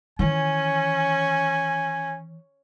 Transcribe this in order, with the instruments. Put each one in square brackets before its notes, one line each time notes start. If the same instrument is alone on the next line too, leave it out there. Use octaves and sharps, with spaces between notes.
[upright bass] D#3 E3 [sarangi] C#4 [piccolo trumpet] G#5